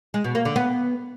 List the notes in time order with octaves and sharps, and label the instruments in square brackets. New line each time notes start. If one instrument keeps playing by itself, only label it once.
[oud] G#3
B2
A#3
D3
B3